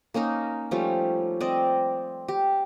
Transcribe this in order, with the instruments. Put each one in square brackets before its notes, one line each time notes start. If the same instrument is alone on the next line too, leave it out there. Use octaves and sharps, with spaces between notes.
[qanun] A#3 C#4 D#4 A#4
F3 G3 A3 C#4
C4 D5 D#5
G4